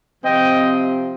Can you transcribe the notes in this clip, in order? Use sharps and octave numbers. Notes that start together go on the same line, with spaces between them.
C3 F3 C4 D#5 G5